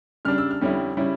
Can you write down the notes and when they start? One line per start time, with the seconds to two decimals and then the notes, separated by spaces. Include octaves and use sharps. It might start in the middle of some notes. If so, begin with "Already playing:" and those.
0.25 C#3 G3 D4 F6
0.38 E6
0.51 F6
0.61 F2 D3 G3 C#4 E4
0.97 C#3 G3 C#4 E4